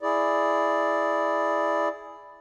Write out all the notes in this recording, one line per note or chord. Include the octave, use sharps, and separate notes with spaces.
E4 G#4 D5